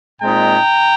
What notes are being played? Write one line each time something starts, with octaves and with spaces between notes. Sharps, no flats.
A#2 G#3 C4 D#4 G5 A#5